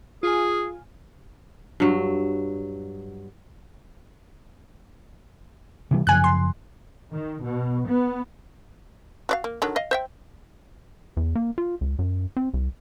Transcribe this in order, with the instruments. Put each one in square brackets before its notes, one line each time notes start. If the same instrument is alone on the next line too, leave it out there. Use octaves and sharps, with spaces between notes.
[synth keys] F4 G#5 [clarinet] G#4
[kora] G2 F#3
[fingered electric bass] C3 E3 G3
[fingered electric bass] F#2 C#3 F3 [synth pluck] G#5 F#6
[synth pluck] C6
[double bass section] D#3
B2
B3
[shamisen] F#4 D5 F5
A#3
D3 D#3 F#3
D#5 F5
C5 E5 G5
[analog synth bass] E2
A#3
F4
C#2
F#2
C4
C2